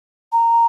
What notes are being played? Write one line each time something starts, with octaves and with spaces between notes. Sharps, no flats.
A#5